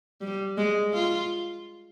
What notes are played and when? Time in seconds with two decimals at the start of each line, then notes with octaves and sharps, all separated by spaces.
0.21 G3
0.57 G#3
0.93 F4